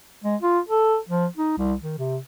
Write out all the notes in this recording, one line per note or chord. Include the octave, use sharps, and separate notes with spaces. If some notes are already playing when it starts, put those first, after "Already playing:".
G#3
F4
A4
F3
D#4
C2
D#3
C3